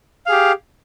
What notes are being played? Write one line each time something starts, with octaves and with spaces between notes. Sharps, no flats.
G4 G#4 F5